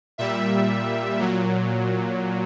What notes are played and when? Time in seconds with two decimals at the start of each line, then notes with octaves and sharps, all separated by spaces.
0.18 A#2 G3 E5
1.19 A#2 F#3